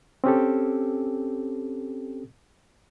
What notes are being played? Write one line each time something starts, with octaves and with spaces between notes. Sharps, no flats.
C4 C#4 G4 A4